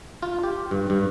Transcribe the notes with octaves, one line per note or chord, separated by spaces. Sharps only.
F4
G4
G2
G2